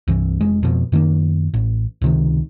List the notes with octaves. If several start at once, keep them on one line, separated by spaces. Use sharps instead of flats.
C2 G2 E3
F1 G#3
F2 B2
F#2 D#3 F#3 A#3
A1
C#2 C3 D#3